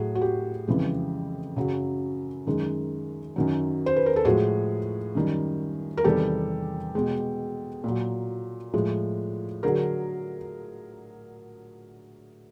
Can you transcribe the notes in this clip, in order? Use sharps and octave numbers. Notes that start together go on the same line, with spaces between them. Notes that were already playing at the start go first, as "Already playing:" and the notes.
Already playing: A2 F#3 F#4 G#4
F#4
G4
F2 C#3 E3 G#3
F#2 C#3 F#3
F#2 D#3 G#3
F#2 D#3 F#3
C5
B4
A#4
A4
A2 F3 G#3 F#4 G#4
F#2 D#3 G3
A#4
E2 C3 D#3 G3 G4 A4
B2 G#3
A#2 F#3
A2 F3 G#3
D3 F#3 G#4 A#4